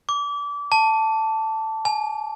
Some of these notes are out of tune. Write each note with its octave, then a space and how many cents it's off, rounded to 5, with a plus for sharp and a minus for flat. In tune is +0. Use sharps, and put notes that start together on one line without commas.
D6 -30
A5 +5
G#5 +35